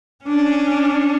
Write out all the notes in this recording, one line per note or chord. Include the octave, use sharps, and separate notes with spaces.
C#4 D4